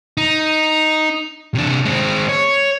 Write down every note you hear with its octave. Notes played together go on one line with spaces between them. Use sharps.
D#4
C3 D4
G#3 C4
C#5